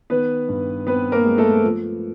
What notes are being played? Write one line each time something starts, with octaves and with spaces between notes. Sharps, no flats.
D#3 B3 B4
G2
B3 C4 B4
A#3 A#4
G#3
A3 A4
F3